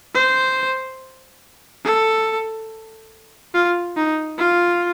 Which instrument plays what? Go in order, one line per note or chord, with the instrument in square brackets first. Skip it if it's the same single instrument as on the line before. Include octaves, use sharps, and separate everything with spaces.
[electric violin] C5
A4
F4
D#4
F4